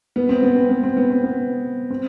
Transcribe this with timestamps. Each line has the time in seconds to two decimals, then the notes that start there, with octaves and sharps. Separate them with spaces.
0.16 B3
0.29 C4
0.43 B3
0.57 C4
0.70 B3
0.83 C4
0.97 B3
1.10 C4
1.24 B3
1.90 C4